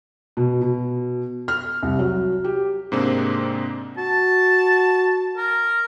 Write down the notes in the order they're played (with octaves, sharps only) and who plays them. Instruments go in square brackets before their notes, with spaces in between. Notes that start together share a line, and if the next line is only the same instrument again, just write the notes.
[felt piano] B2
B2
F6
C2
F#3
G4
[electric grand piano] G#2 C3 G#3 A#3 C4 D4
[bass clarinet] F#4 [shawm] A5
[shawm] A#4